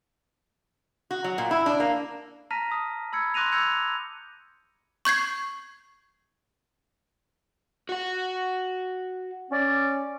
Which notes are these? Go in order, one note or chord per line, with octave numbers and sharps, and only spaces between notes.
F#4
F#3
A#2
E4
D4
A#3
A5 A#5 F6 A#6 B6 D#7
D#6
B5 E6 G#6 C#7
C6 D6 F#6 A#6 D#7 F7
B5 E6 G6 G#6 C#7 F7
C#6 G6 G#6 C7
F#4 F#5
C#4 D5